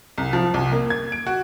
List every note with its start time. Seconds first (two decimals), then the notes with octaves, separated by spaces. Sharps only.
0.18 C2
0.33 F3
0.54 C2
0.72 A#3
0.90 G#6
1.12 D7
1.27 F#4